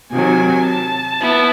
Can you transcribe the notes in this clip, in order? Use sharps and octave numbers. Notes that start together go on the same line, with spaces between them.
C3 D#3 F#3 G#5
A5
B3 E4